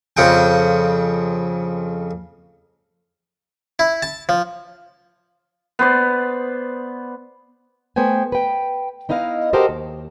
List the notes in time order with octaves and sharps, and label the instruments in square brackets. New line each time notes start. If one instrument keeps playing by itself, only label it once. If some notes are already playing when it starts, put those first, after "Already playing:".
[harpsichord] F2 C#3 F#5 G5
E4
A5
F3
[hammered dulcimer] B3 C5 D5
[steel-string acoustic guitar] A3 B3 C5 G5 G#5
B4 G5
B3 D#4 E4 D#5 F5
F#4 G4 A4 A#4 C5 D#5
D#2